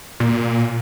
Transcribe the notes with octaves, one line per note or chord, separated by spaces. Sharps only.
A#2